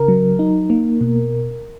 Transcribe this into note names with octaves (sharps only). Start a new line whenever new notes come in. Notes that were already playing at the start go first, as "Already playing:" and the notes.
Already playing: C#3 A#4
F#3
D#4
A#3
B2